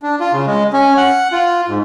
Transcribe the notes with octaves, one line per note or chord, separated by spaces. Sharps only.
D4
F4
C#3
G#3
C#4
F#5
F4
G#2